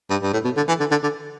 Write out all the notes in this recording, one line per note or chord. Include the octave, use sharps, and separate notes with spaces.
G2
G2
A2
B2
D3
E3
D3
D3
D3